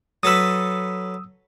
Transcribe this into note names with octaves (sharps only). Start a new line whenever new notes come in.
F#3 A4 B4 D#6 E6